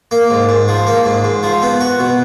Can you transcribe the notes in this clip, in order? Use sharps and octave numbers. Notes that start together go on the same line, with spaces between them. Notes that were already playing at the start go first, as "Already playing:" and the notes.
A#3
G#2
G#2
F3
A#3
G#2
G#2
F3
B3
F#4
B2